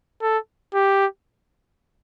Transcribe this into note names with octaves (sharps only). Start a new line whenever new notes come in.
A4
G4